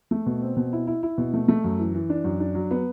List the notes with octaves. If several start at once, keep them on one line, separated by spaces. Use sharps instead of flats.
A3
B2
C4
B2
E4
E4
E4
B2
A3
A3
F#2
E3
E3
D4
F#2
D4
F#3
B3